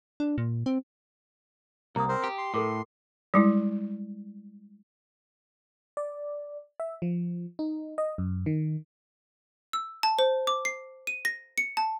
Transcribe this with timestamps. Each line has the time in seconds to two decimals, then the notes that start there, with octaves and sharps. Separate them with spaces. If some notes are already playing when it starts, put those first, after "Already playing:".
0.20 D4
0.38 A#2
0.66 C4
1.96 C2 A#3 A#5 D#6
2.09 C4 A#4 C5
2.24 G4
2.38 C6
2.54 A2 A4 A#4 D6
3.34 G3 G#3 E4
5.97 D5
6.80 E5
7.02 F3
7.59 D#4
7.98 D#5
8.18 F#2
8.46 D#3
9.73 E6
10.03 A5
10.19 C5
10.47 D6
10.65 C7
11.07 D#7
11.25 A#6
11.58 C#7
11.77 A5